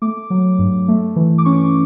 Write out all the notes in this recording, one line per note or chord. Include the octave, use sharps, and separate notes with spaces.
A3 D6
F#3
G2
A3
E3
D6
C#4 C#6
D6